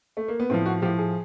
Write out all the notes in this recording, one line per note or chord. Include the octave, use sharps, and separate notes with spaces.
A3
A#3
B3
A2 F3 C4
F#4
A2 F3 G4
G#4